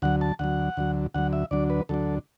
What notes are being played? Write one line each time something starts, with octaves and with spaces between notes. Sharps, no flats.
D2 D3 F#3 F#5
A5
D2 D3 F#3 F#5
D2 D3 F#3
D2 D3 F#3 F#5
E5
D2 D3 F#3 D4 D5
B4
D2 D3 F#3 D4 A4